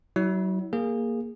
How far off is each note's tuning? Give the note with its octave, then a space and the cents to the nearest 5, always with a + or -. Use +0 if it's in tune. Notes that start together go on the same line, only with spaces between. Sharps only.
F#3 +30 E4 -30
A#3 +0 G#4 -15